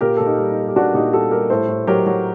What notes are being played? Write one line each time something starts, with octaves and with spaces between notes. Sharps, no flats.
A#2 G4 A#4
A#2 A4
D#4 G4
G3
D#4
G3 A4
G4
A#2 D4 F#4
A#2 D#4 G4
G3 F#4 A4
G3 G4 A#4
A2 A4 C5
A2
F#3 G4 A#4
F#3